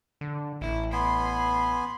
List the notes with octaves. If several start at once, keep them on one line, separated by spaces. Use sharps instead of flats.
D3
A1 E4
B3 G#5 B5 C6